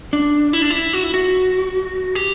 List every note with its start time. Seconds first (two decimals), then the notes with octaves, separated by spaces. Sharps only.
0.13 D4
0.53 E4
0.62 D4
0.70 E4
0.93 F#4
1.04 E4
1.14 F#4
2.15 G4